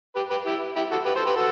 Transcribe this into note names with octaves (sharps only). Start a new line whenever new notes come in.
G4 B4
G4 B4
E4 G4
E4 G4
F#4 A4
G4 B4
A4 C5
G4 B4
F#4 A4